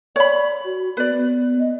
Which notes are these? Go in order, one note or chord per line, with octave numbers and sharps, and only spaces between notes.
C#5 D5 B5
F#4
B3 B4 D5
B3
D#5